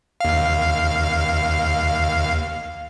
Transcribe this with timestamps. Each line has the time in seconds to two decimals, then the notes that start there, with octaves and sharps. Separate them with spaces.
0.20 D#2 F5